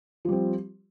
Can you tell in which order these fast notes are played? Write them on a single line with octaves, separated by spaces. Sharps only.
F3 G3 C4